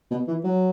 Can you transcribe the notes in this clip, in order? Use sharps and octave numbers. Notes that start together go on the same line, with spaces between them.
B2
E3
F#3